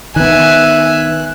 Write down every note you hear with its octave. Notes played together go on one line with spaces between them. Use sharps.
D#3 B3 E5 G#5 F#6